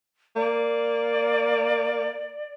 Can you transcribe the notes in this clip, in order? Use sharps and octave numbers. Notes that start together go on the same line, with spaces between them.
A#3 D5